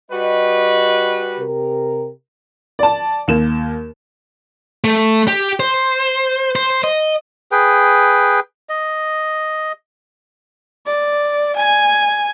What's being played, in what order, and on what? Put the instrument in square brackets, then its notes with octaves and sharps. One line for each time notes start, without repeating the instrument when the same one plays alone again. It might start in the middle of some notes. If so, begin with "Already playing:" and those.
[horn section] G3 F#4 B4 [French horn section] D#5
[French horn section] C3 G4 A#4
[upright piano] D5 A5
D#2 A#3 E7
[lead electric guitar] A3
G4
C5
C5
D#5
[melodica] G#4 B4 G5
D#5
[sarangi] D5
G#5